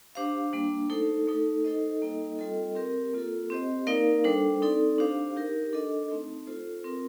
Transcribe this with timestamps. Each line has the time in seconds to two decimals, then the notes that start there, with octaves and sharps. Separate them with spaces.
0.15 D4 G4 C5 F5
0.53 G3 A#3 D4
0.90 A3 D#4 A4 C5
1.27 A3 D#4 A4
1.64 D#4 A4 C5 D#5
2.02 G3 A#3 D#4 A4 D#5
2.38 G3 C4 F4 A4 D#5
2.75 C4 G4 A#4
3.13 A#3 F4 A4
3.50 C4 G4 C5 D#5
3.87 A#3 D#4 A#4 D5 F5
4.24 G3 D4 A4 C5
4.62 C4 D#4 A4 D5
4.98 D4 G4 C5 F5
5.36 D#4 G4 A#4
5.73 D4 A4 D#5
6.10 A3 C4 D#4
6.47 F4 A4 C5
6.84 C4 F4 A#4